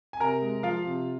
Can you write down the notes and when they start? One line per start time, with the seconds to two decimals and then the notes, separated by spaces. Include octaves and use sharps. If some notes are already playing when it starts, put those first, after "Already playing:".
0.13 G#5
0.20 C3 A#4 A#5
0.41 G#3
0.63 F3 F4 F5
0.84 C3